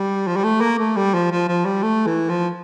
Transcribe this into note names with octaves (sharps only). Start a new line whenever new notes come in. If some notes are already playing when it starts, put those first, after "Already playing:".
Already playing: G3
F3
G3
A3
A#3
A3
G3
F3
F3
F3
G3
A3
E3
F3